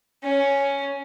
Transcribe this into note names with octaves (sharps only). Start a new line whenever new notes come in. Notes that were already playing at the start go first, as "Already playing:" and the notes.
C#4